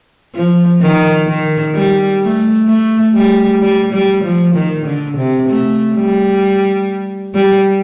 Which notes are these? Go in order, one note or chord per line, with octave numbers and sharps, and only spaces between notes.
F3
D#3
D#3
G3
A3
A3
G3
G3
G3
F3
D#3
D3
C3
A3
G3
G3